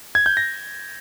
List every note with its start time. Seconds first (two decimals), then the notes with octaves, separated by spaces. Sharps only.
0.15 G#6
0.26 G6
0.37 A#6